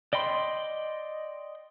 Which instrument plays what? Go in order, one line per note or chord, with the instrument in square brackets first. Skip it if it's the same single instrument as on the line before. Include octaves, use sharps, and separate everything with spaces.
[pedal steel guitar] D5 D#5 G5 B5 C6